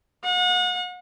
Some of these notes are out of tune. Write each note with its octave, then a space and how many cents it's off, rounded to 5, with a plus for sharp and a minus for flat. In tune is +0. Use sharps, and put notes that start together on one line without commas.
F#5 -35